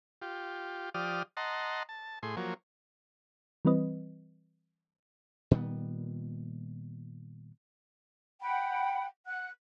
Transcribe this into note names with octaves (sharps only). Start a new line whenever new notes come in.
F4 G4
F3 G4 D5 D#6 F6
D#5 F#5 A5 A#5 C6
A5
A2 G#4 C6
F3 F#3 A#3 C#5
E3 G3 C4 B4 D#5
A#2 D#3 G3 B3
F#5 G5 B5
F#5 F#6